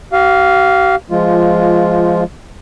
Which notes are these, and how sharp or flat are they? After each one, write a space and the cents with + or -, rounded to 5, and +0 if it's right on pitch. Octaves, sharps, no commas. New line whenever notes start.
G4 -45 F5 +0
F3 -15 G#3 +0 F4 +0